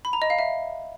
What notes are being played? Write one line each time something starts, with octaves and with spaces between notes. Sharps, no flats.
B5
A#5
D#5
F5
E5